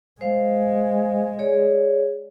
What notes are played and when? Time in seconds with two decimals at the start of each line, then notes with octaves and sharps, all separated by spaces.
0.21 G#3 C5 F5
1.39 G#4 C#5 D5